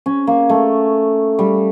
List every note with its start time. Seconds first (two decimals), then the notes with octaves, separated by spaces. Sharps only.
0.06 C#4
0.27 A#3
0.49 A3
1.39 G3